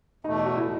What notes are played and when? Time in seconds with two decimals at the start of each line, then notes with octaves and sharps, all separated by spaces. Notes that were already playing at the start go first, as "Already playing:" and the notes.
0.24 E2 B2 A3 D#4
0.45 F#4
0.57 E4